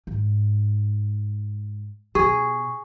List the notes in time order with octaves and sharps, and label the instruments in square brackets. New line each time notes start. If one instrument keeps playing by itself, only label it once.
[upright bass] G#2
[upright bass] B2 [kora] G#4 [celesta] C#6